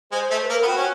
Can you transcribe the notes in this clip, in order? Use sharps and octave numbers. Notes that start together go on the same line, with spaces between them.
G#3 C5
A3 C5
B4
A#3 A#4
B3
C4 F#4
C#4